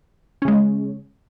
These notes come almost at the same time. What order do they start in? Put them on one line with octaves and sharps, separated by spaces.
C#4 C#3 G#3